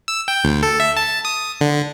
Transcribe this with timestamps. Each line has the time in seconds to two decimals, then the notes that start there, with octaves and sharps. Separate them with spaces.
0.08 E6
0.28 G5
0.44 D2
0.63 A4
0.80 E5
0.97 A5
1.25 D#6
1.61 D3